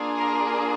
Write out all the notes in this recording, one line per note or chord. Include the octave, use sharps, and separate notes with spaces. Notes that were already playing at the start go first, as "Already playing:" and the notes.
Already playing: A#3 D4 F4 G#4
A#4